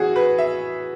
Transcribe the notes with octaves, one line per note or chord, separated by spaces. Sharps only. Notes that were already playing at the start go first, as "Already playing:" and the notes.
Already playing: E3 C#4 F#4 G#4
B4
E5